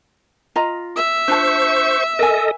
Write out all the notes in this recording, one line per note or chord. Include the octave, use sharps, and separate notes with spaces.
F4 D#5 A#5
E5
D4 F4 C5 A5 C#6
A4 A#4 D#5 G#5